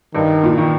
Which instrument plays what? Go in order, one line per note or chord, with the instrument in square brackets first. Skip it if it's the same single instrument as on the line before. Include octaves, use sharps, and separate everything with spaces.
[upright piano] G2 [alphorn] D#3
[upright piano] A#2
D#3